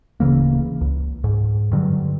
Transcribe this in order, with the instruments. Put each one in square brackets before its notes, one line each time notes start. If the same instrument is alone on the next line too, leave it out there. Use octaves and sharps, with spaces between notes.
[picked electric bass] D1 C#3 E3 A#3
C#2
G#2
G2 D3 F#3